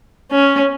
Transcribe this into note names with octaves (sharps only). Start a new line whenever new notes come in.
C#4